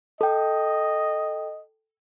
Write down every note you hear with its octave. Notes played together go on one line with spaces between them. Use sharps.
A4 D#5 G5